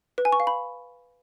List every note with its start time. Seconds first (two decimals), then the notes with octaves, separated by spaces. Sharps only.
0.18 B4
0.25 G#5
0.32 C#6
0.40 F5
0.47 B5